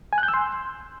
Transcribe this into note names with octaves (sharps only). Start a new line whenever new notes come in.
G#5
F#6
G6
E6
C6